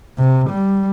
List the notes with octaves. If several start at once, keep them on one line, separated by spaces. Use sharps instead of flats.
C3
G3